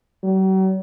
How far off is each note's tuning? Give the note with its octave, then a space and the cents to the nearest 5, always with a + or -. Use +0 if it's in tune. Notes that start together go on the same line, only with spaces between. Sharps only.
F#3 +45